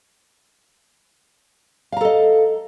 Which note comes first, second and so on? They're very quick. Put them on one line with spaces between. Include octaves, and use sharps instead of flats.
F5 A#5 A4 D#5